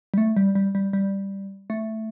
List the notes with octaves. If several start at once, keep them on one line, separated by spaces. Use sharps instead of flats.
G3
A3
G3
G3
G3
G3
A3